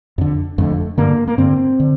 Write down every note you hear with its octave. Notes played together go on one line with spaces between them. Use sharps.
F2 D3
F2 D3 A3
G2 D3 A#3
A#3
G2 D3 C4
D3